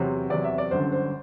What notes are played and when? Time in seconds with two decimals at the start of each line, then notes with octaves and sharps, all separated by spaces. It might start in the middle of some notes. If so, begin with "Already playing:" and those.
Already playing: E2 C3 F#3 C5
0.30 E2 C3 F#3 D5
0.44 E5
0.58 D5
0.71 G1 F#2 D3 C5
0.92 C5